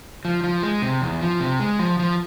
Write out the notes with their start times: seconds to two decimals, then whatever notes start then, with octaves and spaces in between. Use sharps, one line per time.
0.25 F3
0.44 F3
0.63 G#3
0.82 C3
1.02 E2
1.21 F3
1.40 C3
1.60 G#3
1.79 F3
1.99 F3